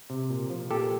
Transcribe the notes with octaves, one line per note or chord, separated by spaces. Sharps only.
C3
A#2
F3
A#2 G4 A4